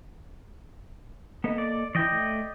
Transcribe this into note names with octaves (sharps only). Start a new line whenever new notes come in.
A#3 B3 A4 D#5
D5
E3 E4 D5 D#5 G5
A3